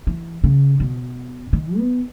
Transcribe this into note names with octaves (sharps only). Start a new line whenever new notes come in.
E3
C#3
B2
D#3
B3